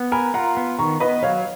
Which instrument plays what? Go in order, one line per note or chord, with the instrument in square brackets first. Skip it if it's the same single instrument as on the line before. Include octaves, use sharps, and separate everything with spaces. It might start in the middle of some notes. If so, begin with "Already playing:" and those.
Already playing: [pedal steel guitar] B3
[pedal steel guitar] A#4 [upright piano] G#5 B5
[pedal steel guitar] F4 [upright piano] F#5 A#5
[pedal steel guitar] B3
[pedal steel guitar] D#3 [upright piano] A#5 C#6
[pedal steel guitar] B3 [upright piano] B4 D#5
[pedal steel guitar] F#3 [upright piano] C#5 F5